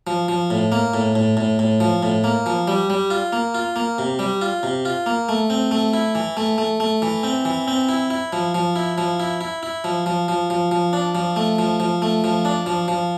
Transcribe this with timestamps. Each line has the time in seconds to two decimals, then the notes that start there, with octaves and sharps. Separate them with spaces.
0.07 F3
0.28 F3
0.50 A2
0.72 A#3
0.94 A2
1.15 A2
1.37 A2
1.59 A2
1.80 F3
2.03 A2
2.24 A#3
2.46 F3
2.68 G3
2.90 G3
3.10 F4
3.33 A#3
3.55 F4
3.76 A#3
3.98 C3
4.19 G3
4.41 F4
4.63 C3
4.85 F4
5.06 A#3
5.29 A3
5.50 C4
5.71 A3
5.94 E4
6.15 E3
6.37 A3
6.58 A3
6.80 A3
7.02 E3
7.23 C4
7.45 E3
7.68 C4
7.89 E4
8.10 E4
8.33 F3
8.55 F3
8.76 E4
8.98 F3
9.20 E4
9.41 E4
9.63 E4
9.84 F3
10.06 F3
10.28 F3
10.50 F3
10.71 F3
10.93 D4
11.15 F3
11.36 A3
11.59 F3
11.80 F3
12.02 A3
12.24 F3
12.45 D4
12.66 F3
12.88 F3